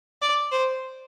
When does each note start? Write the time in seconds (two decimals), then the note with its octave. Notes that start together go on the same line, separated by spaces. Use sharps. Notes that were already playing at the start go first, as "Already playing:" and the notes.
0.22 D5
0.51 C5